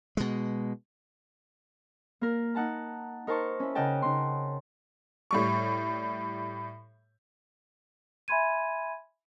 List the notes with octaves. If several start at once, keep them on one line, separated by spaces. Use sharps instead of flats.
B2 G#3
A#3 A#4
D#4 F#5 A5 A#5
D#4 A#4 C5 A5 C#6
C#4 E4
C#3 A#4 D#5 F#5 G5 A5
C#3 D#4 C6
A2 G3 C#6
E5 G#5 B5 C6 G#6 D#7